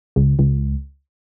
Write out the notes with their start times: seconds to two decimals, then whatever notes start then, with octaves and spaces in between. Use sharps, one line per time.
0.16 C#2
0.39 C#2